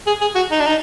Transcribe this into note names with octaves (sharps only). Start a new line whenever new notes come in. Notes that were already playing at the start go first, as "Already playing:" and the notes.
G#4
G#4
F#4
D#4
D4
D#4